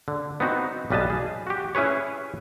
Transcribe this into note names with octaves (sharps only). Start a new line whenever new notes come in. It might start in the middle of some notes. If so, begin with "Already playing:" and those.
D3
B3 C4 D#4 F#4
B1 G3 B4 D#5 A5
G#4
F#4 G4
C#4 E4 G#4 B4 C#5